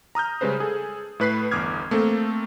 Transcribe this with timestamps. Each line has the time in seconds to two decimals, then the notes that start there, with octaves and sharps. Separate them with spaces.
0.15 A#5 D#6 F6 G6
0.41 C#3 G3 G#3 C#4 B4 C5
0.60 G#4 A4
1.20 A2 A3 B4 F#6 B6 C7
1.51 G1 E2 D6 D#6 F6 G#6
1.91 A3 A#3 C4 A4